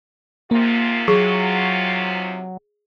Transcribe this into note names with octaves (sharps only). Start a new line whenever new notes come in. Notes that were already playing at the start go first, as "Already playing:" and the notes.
G#2 C3 A#3 F4
F#3 G#4 C#6